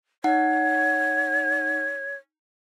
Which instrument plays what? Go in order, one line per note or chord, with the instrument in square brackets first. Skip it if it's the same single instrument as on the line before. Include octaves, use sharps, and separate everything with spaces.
[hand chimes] D#4 F#5 [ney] C#5